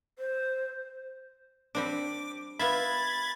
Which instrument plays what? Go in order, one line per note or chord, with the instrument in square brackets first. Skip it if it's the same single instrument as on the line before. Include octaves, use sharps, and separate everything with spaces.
[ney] C5
[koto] G3 C4 D4 [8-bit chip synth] D6
[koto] B3 F4 E5 [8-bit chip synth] B5 G#6 A6